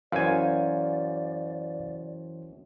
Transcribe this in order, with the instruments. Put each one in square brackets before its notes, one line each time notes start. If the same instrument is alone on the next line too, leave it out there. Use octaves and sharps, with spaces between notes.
[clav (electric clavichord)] F#2 G#5 [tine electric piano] E3 C5 [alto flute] D5 [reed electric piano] F5